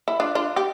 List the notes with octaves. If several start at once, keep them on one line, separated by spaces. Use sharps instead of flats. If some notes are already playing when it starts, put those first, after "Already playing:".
E4
D4 F4
D4 F4
G4